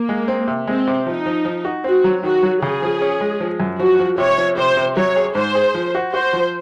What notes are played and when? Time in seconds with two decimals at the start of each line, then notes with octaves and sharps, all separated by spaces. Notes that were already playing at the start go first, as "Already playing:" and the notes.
Already playing: A#3
0.09 G#3
0.28 C4
0.48 C3
0.67 G#3 C4
0.87 C3
1.07 F3 D#4
1.26 F3
1.45 F3
1.65 F#4
1.84 C4 F#4
2.04 F#3
2.23 D#3 F#4
2.43 F#3
2.62 C#3 G#4
2.82 F3
3.02 C#4
3.21 G#3
3.40 F3
3.60 F#2
3.79 F3 F#4
3.99 F3
4.18 C3 C#5
4.38 F3
4.58 C3 C5
4.77 C3
4.96 F#3 C#5
5.16 G#4
5.35 G#2 C5
5.55 G#4
5.75 F3
5.95 F#4
6.14 F#4 C5
6.33 F3